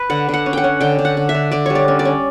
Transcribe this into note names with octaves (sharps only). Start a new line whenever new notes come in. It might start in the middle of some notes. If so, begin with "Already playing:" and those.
Already playing: B4
D3 F#5
D3 F#5
C#4
F#5 G5
C#4
D3 G5
D3
F#5
D3
E5
D3
D3 D5
G3 C#5
D5
C#4
D5
C#4